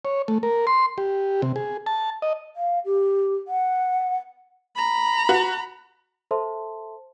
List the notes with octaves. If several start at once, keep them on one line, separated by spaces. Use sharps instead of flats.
C#5
A3
A#4
C6
G4
C3
G#4
A5
D#5
F5
G4
F#5
A#5 B5
F#4
A4 C5 E5 A5 C6